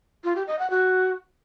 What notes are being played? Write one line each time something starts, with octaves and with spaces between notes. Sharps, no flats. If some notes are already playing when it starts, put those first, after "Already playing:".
F4
G4
D#5
F#5
F#4